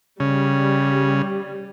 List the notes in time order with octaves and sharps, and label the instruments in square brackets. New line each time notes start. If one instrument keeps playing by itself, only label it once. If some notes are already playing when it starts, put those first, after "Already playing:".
[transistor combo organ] C#3 [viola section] G3